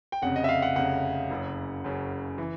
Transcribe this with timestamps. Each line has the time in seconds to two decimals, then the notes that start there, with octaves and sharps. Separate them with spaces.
0.12 G5
0.22 F1 F2 C#3 F#5
0.36 D#5
0.44 E5
0.49 F5
0.62 F#5
0.76 F1 F2 C#3 F#5
1.30 F#1 F#2 C#3
1.84 F#1 F#2 C#3
2.38 E3